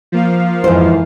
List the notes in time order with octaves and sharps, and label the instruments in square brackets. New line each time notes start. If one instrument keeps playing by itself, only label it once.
[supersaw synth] F3 A#3 F5
[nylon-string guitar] F2 C5 [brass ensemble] G#2 E3